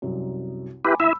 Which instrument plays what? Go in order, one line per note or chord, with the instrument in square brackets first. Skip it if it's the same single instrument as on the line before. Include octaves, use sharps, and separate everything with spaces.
[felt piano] C2 F#2
[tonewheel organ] E4 G4 B4 [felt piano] G#5 B5 D6
[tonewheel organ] E4 E5 [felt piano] B5 E6